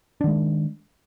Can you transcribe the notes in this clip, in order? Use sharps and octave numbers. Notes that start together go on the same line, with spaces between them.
D#3 G#3 D4